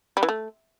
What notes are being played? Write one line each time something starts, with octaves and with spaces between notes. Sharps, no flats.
G3
E3
A3